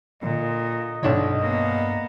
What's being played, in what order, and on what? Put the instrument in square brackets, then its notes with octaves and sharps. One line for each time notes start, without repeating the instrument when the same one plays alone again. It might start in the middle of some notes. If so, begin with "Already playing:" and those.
[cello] A#2 [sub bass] D3 [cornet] D#5
[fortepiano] B1 D4 C#5 [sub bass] G2
[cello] A#3 B3